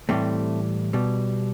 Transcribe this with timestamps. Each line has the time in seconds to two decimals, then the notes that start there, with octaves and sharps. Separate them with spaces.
0.09 A2 E3 G3 A3 C4
0.93 B2 G3